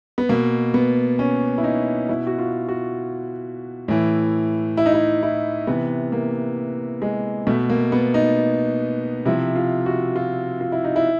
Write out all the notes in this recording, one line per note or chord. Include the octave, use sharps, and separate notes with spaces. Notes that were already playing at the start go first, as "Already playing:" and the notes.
B3
B2 A#3
B3
C#4
E4
D#4
B2 E4
F#4
F4
F#4
A2 E3
E4
D#4
E4
E4
C3 E3 B3
A#3
G#3
B2 A3
A#3
B3
D#4
C3 F3 E4
F4
F#4
F4
F4
E4
D#4
E4